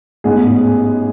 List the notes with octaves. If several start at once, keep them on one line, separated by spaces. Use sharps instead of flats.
A1 G#2 G#3 B3 G#4